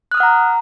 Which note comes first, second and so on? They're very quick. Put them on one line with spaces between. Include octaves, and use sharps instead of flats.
F#6 D#6 F6 F#5 A#5